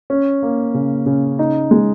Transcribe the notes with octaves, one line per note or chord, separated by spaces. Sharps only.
C#4
A#3
C#3
C#3
D#4
G#3